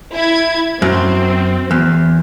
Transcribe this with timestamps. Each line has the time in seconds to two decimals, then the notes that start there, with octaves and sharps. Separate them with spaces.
0.13 E4 G#6
0.82 F#2 C4
1.71 E2